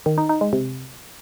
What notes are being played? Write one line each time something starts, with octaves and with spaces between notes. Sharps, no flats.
D#3
D#4
D#4
G#3
C3